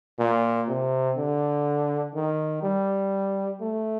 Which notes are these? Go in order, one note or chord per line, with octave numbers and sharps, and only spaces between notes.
A#2
C3
D3
D#3
G3
A3